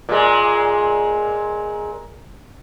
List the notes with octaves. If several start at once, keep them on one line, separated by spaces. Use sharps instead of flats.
A#2 G#3